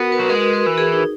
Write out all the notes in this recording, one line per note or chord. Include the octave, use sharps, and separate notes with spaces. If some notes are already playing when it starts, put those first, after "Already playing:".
Already playing: B3 F#4 A#4
B4
F#3
G#3 A#4
B4
A#4
E3
G#4
D#4